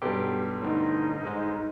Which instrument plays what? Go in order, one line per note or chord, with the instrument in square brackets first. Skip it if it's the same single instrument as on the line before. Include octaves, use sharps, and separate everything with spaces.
[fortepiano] B1 G2 [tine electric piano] G4
[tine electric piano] A2 D3 [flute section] D#4
[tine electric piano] G#2 G#3